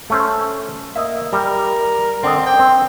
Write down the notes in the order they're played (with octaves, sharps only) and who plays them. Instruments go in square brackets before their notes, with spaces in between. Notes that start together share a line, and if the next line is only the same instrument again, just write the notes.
[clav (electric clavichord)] A3 C#4 C5
[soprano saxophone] A#3 [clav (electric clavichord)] D#5 E5
[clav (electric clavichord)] G3 [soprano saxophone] A#4
[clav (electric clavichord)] D3 D5 D#5 [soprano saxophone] C4
[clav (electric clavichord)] C5 [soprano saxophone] G5
[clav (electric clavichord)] C4